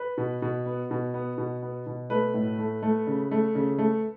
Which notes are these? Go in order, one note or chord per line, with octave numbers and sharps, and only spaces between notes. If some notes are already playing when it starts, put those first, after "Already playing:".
Already playing: B4
B2
B2
B3
B2
B3
B2
B3
B2
A3 B4
A2
A3
A3
C#3
A3
C#3
A3